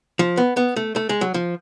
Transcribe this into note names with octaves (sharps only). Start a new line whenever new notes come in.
F3
B3
B3
A3
A3
G#3
F#3
F3